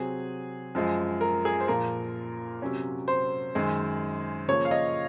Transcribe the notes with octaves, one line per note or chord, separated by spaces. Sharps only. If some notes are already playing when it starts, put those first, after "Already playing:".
Already playing: C3 F#3 C4 G#4
F#2 F3 G#3
A#4
G#4
C5
A#2 F3 A#3 A#4
C3 F#3 C#4
C5
F#2 D#3 G#3
C#3 F3 A#3 C#5
F5
D#5